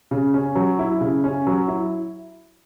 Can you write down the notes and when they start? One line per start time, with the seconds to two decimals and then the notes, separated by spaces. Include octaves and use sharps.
0.11 C#3
0.34 C#4
0.55 F#3
0.79 E4
1.01 C#3
1.24 C#4
1.47 F#3
1.68 E4